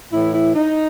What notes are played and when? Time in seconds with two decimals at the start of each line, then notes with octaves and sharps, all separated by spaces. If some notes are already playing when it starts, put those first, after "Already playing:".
0.13 A2 E3 E4
0.34 E4
0.55 D#4